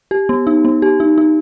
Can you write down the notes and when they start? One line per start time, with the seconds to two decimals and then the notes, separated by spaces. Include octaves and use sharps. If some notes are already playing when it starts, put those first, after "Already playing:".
0.11 G4
0.29 B3
0.47 D#4
0.65 B3
0.82 G4
1.00 D#4
1.18 D#4